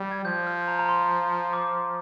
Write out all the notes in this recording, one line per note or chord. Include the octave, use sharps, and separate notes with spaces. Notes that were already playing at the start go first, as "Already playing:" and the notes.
Already playing: G3
G#6
F3 G6
F6
A#5
A#5
C6
D6